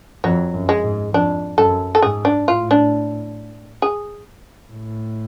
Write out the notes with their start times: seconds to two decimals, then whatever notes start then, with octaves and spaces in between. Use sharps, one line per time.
0.24 F2 F#3
0.54 F#2
0.69 G#3
0.84 G#2
1.14 F2 D4
1.58 F#2 A4
1.95 A4
2.02 G#2 G#4
2.25 D4
2.48 A2 F4
2.71 D4
3.82 G#4
4.71 A2